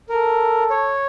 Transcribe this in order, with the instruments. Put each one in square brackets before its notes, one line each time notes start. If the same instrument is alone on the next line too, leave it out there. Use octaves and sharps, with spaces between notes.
[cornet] A4 [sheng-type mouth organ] A#4
[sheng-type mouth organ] C#5